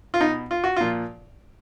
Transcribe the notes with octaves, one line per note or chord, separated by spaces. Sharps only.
F4
B2 D#4
F4
F#4
A#2 F3 F4